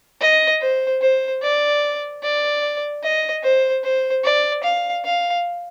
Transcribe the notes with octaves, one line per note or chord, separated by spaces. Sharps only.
D#5
C5
C5
D5
D5
D#5
C5
C5
D5
F5
F5